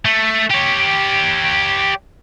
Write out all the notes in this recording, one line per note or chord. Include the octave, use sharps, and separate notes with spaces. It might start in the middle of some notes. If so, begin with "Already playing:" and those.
A3
G4 C#5